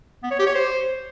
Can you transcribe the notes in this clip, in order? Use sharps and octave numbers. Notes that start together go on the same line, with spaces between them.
B3
C#5
G4
C#5
C5